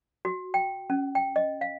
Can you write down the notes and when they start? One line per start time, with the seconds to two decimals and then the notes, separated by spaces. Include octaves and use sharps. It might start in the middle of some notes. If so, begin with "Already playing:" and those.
0.25 F#4
0.54 G5
0.90 C#4
1.15 G5
1.36 D#5
1.61 F5